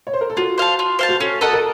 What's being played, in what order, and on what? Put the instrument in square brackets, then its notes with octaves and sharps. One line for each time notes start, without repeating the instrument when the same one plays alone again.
[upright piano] C#5
C5
A#4
A4
[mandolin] F4 [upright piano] F#4
[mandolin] C5 F5 A5
F4
C5 F5 A5
[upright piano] F#4
[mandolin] C#4 [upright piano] A4
[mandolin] A4 D#5 F#5 [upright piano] A#4
[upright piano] A#4